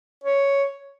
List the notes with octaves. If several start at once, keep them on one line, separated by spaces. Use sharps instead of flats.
C#5